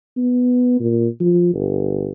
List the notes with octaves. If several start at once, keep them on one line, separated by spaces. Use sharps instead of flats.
B3
A#2
F3
G1